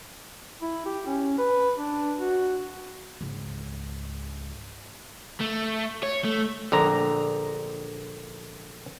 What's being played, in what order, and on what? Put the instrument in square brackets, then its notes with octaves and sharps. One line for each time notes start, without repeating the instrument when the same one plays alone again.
[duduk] E4
G4
C#4
B4
D4
F#4
[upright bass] C#2 G#2
[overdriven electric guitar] A3
C#5
A3
[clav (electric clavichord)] A#1 D3 A#5